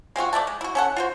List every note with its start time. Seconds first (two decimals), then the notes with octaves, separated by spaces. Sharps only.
0.16 G#3 C4 F4 F#4
0.33 A3 D5 E5 A5
0.47 G#3
0.61 E4 F#4
0.75 C#4 A4 F#5
0.96 F4 F#4 C5